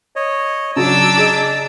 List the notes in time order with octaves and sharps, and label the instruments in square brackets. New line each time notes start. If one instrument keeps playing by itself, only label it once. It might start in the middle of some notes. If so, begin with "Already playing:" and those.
[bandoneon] C#5 D#5
[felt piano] C#3 F#3 [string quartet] D4 D6 E6 [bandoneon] A5 A#5
[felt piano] G#4 D#5